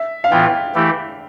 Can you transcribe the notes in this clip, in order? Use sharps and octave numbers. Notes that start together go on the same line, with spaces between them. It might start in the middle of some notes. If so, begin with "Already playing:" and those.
Already playing: E5
F5
A2 E3 B3 F4 G5
E3 A3 E4 G4